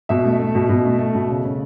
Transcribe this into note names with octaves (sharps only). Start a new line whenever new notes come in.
B2 E5
A3
A3
B2
B2
A3
A3
B2
C#3
C#3